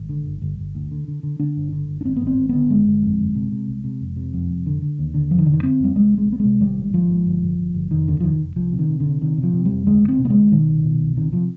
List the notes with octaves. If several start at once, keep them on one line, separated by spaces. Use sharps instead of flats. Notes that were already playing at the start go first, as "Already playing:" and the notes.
Already playing: G#1
D3
G1
G1
G1
D2
D3
D3
D3
D3 D4
G1
D3
G1
D4
G#1 C4
B3
G#1
C4
G#1
D3 B3
G1 G#3
G1
F2
G1
C3
C3
C2
C3
F1
C3
F2
F1
D3
D3
D#2
D3
F1 F3
D#3
F1 D3
D#3
D3 C4
F2 G3
C2 G#3
C3
G#3
C2 B3
G#3
C3
G#1 G3
G#2
G#1 F3
G#2
G1
G1
G1
G1
F1 D#3
D#2 D3
F3
F1 D#3
F1
C2 F3
C3
D#3
C3
D3
C3
C3 D#3
C3
F3
C3
G3
F1
D2 G#3
D2
C4
C3
B3
G#3
D2
B2 D#3
C2
B2
C2
C3 D#3
C3 F3